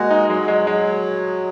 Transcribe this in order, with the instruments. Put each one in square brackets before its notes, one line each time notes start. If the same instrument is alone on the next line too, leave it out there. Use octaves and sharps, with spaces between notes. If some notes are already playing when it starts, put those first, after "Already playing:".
Already playing: [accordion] G#3 [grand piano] A#3 F#4
[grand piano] D#4
[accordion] F#3 [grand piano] G#3
[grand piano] G#3
G#3